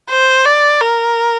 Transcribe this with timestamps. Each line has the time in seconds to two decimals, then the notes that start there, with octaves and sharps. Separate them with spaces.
0.10 C5
0.45 D5
0.81 A#4